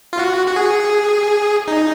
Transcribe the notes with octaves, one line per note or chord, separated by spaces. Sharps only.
F4
F#4
F#4
G#4
D#4